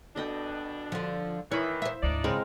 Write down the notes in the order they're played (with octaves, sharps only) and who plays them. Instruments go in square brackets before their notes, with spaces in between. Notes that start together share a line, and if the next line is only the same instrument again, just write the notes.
[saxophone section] B2 D4 [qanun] A4 D#5 G5
[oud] D3 F3
[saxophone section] D#3 E3 [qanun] E4 B5 [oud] C#5
[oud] C5 E5
[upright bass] D2 G#2 [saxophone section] D4 D#4 D5
[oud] C#3 [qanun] G#3 C4 A#4